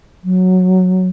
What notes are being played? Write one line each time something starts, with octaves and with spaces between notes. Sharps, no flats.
F#3